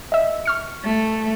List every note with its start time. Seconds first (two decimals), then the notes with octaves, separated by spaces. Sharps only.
0.12 D#5 E5
0.46 C#6 F6 C#7
0.84 A3